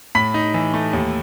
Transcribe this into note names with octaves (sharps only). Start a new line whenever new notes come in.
A2 B5 B6
D#4
E3
A3
D#2